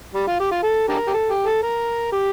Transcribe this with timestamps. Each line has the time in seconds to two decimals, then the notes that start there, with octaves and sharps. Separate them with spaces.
0.14 G3
0.27 F4
0.40 G4
0.51 F4
0.63 A4
0.89 D4 G4 A#4
1.07 G4
1.13 A4
1.30 G4
1.46 A4
1.63 A#4
2.12 G4